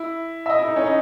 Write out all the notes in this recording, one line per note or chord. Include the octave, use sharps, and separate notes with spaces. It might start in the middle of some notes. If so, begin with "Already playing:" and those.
Already playing: E4
E5
D#5
E4
D#4
C#4
D#4